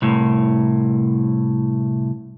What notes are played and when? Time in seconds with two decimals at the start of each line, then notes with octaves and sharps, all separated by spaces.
0.02 C2 A2